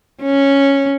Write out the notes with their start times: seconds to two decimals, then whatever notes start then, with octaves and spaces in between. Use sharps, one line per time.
0.22 C#4